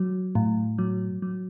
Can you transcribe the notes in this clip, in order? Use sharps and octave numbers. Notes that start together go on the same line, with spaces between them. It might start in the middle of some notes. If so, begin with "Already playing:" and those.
Already playing: F#3
A2
F#3
F#3